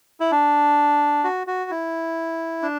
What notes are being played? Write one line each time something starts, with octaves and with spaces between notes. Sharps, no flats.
E4
D4
F#4
F#4
E4
D4